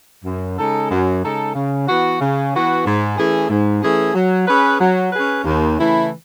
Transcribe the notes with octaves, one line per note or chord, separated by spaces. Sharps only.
F#2
C#3 G#3 D#4 A4
F#2
C#3 G#3 D#4 A4
C#3
E3 B3 F#4
C#3
E3 B3 F#4
G#2
E3 A3 C#4 G#4
G#2
E3 A3 C#4 G#4
F#3
C#4 G#4 B4
F#3
C#4 G#4 B4
D#2
C#3 E3 A3 E4